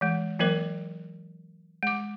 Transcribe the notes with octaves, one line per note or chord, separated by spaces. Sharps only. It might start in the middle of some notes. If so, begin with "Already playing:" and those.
E3 G#3
E3 F#3 A#3 A#4 C5
G#3 D6